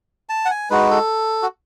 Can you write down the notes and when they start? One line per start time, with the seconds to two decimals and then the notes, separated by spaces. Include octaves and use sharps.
0.29 A5
0.45 F#5
0.50 G#5
0.70 G#3 D#4 F#4 B4
0.91 A4
1.42 F#4